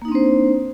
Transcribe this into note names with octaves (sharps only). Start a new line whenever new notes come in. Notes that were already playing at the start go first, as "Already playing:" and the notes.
A#3 C4 D4 D#4 C5